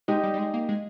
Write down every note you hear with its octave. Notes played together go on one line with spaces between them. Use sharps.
G#3 D#4 G4
G3
G3
G#3
A#3
G#3